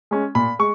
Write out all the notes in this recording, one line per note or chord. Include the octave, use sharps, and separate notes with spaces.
G#3 C#4
A#2 B5
G#3 C#6